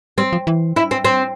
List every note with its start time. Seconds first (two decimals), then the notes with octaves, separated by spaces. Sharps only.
0.18 G3 C4
0.33 F3
0.47 E3
0.76 E4
0.91 C4
1.05 C4